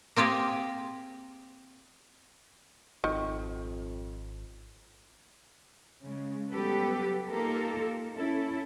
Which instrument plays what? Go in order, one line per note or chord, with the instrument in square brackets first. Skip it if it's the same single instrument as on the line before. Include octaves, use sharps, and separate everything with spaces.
[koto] A#3 C4 F4 G4 G#4
[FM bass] G#1 [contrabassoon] F2 [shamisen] D#3
[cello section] C#3 G#3
F#3 G3 B3 G4 A4 B4
A#3 D#4 F4 G4 A4 A#4
C#4 E4 A4